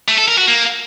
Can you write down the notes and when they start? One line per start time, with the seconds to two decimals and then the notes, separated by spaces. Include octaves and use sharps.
0.08 A3
0.18 A4
0.28 A#4
0.38 F#4
0.48 A#3